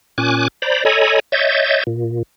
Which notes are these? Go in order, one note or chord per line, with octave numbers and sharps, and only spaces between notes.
A#2 C#4 G#5 D6 F#6
C5 D5 A#5 B5
A4 C#5 D#5 G#5 A#5 B5
C#5 D#5 E5 G6 A6
A#2